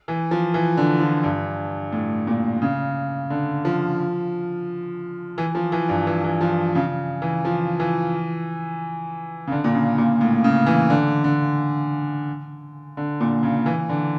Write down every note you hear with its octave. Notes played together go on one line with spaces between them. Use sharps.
E3
F3
E3
D3
F3
G2
A2
A#2
C#3
D3
F3
E3
F3
E3
G2
E3
E3
F3
C#3
E3
F3
E3
C#3
D3
A#2
C#3
A#2
A2
C#3
E3
D3
D3
D3
A#2
C#3
E3
D3